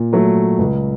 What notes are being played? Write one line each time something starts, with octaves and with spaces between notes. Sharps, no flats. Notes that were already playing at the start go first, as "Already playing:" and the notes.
Already playing: A#2
F#3 A3
C#2